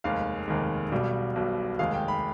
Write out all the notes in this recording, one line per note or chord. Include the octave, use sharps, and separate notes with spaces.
F1 D#2 D#3 G#3 F5
F1 D#2 D#3 G#3
B1 B2 G3
B1 B2 G3
F1 D#2 D#3 G#3 F5
G5
B5